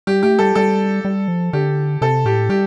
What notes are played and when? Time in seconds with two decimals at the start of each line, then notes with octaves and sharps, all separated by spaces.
0.07 G3 G4
0.23 A3 G4
0.39 G3 A4
0.55 G3 A4
1.05 G3
1.28 F3
1.53 D3 G4
2.01 C3 A4
2.25 A2 G4
2.49 G3 G4